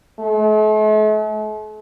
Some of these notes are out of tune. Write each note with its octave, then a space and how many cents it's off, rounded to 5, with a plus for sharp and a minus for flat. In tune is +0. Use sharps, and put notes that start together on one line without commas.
A3 -45